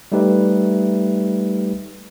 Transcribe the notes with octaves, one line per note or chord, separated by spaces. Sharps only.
G3 A3 D#4 G4 B4 E5